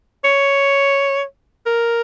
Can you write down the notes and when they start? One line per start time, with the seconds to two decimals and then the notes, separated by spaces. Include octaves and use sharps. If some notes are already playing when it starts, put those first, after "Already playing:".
0.24 C#5
1.66 A#4